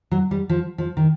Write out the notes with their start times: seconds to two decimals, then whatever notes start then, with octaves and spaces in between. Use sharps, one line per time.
0.11 F#3
0.31 G3
0.49 F3
0.78 F3
0.97 D#3